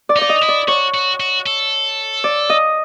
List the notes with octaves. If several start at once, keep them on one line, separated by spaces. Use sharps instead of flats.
D5
D#4
D5
D#5
E4
D5
F#4 C#5
F#4
F#4
A4
D5
D#5